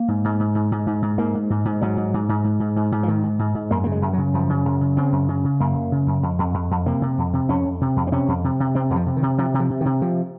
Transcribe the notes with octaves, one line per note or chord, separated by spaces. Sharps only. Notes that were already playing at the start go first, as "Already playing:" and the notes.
Already playing: A#3
G#2
G#2
G#2
G#2
G#2
G#2
G#2
G#2 A#3
G#2
G#2
G#2
G#2 F#3
G#2
G#2
G#2
G#2
G#2
G#2
G#2
F3
G#2 D#3
G#2
G#2
G#2
F#2 A#3
C#3 A#3
G#3
F#2
F#3
C#3
F#2 F3
C#3
F#2
C#3
C#3 C4
F#2
C#3
C#3
F#2 A#3
F#2
C#3
F#2
F2
F2
F2
F2
C3 A#3
C3
F2
C3
F2 C#4
F2
C3
F2
C4
C3 C#4
F2
C3
C3
C3 C4
F2 F#3
F3
C3
D#3
C3
C3 F3
C3
F3
C3
D#3
C3
C3 F3